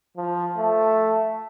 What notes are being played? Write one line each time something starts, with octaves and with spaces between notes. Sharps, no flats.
F3
A3